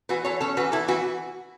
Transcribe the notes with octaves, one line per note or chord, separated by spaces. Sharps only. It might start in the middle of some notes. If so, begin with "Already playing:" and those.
E3 F#4 B4
E3 A4 C#5
C#4 A4 C#5
E3 F#4 B4
E3 E4 A4
E3 F#4 B4